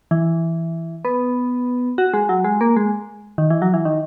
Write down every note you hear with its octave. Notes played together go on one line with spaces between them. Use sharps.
E3
B3
F#4
G#3
F#3
G#3
A#3
G#3
D#3
E3
F#3
E3
D#3